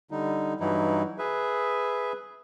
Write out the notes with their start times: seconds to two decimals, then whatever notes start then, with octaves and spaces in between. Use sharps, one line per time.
0.11 D3 G3 D#4
0.60 G2 E3 F#3 D#4 E4
1.19 G#4 B4 E5